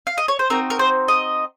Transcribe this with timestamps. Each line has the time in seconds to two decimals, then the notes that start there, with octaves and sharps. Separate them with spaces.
0.07 F5
0.18 D#5
0.28 C#5
0.39 C5
0.50 C4 D#4 F#4 A#4
0.70 A#4
0.79 C5
1.08 D#5